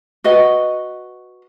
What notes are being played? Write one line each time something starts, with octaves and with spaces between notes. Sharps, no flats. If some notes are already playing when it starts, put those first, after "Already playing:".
F#4 B4 D#5 F#5